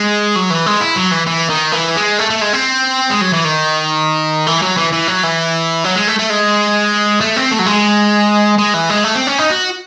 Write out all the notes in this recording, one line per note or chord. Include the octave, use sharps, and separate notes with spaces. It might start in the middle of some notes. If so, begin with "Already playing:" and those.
Already playing: G#3
F#3
E3
G#3
E4
F#3
E3
E3
D#3
E3
G#3
A3
A3
G#3
C4
G#3
F#3
E3
D#3
E3
F#3
E3
E3
F#3
E3
F#3
G#3
A3
A3
G#3
A3
C4
A3
F#3
G#3
G#3
E3
G#3
A3
C4
C#4
D#4
F#4